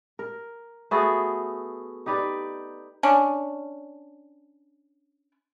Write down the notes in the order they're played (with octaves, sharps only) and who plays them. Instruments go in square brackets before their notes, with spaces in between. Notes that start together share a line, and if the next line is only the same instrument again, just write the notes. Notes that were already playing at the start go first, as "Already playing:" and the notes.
[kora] A#4
A3 B3 F#4 G#4
D#4 G4 B4 D5
[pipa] C#4 D4